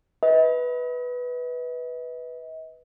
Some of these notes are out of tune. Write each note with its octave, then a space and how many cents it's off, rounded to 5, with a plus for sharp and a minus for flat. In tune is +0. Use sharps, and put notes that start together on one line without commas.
B4 +0 D#5 +40